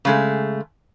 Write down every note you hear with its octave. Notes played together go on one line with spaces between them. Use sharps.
C#3 G#3 A3